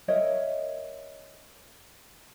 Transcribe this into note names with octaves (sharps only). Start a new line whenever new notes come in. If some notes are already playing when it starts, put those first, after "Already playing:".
A#4 C#5 D#5 E5